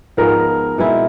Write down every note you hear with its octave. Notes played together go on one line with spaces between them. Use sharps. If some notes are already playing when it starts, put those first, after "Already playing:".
G#2 F3 G#3 B3 A#4
B2 G#3 C4 E4